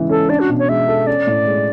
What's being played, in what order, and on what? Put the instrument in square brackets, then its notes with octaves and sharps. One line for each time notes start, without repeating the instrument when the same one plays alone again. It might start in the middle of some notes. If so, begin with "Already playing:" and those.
Already playing: [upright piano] G#2 C#3 E3 G#3
[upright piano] C#4 [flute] A4
[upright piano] D4 [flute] D5
[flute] F#4
[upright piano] B2
[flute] C#5
[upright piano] G#3 [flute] E5
[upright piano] A4
[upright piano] C#4 [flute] D5
[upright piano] A2
G#3